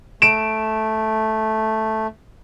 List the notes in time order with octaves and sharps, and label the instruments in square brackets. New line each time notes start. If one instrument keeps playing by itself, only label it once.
[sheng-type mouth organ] A3 [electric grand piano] D7 E7